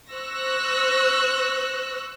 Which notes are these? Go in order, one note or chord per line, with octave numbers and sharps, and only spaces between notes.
C5 C#6 E6 F#6 A#6